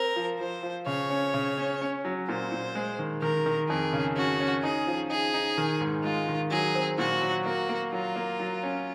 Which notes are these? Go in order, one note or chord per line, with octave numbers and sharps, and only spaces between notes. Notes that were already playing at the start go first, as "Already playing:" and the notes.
Already playing: C4 A#4
F3
F3 C5
F3
C#3 C#5
C#4
C#3
C#4
C#4
F#3
A#2 C5
A#2
G#3
D#3
D#3 A#4
D#3
F2 G#4
C#3
C#4 F#4
C#4
D#4 G#4
F3
D#4 G#4
D#4
D#3
G#2
G#3 F4
D#3
F#3 G#4
C4
A#2 F#4
F#3
A#3 F#4
A#3
F#3 F4
A#3
F#3
C#4